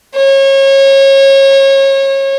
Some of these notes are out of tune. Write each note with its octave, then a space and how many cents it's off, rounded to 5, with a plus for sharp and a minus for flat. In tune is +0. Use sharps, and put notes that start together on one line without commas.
C#5 -30